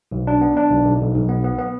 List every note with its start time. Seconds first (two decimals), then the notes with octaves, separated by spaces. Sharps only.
0.11 B1
0.27 D4
0.41 B3
0.57 D4
0.71 B1
0.85 B1
1.01 B1
1.15 B1
1.29 B3
1.44 B3
1.58 B3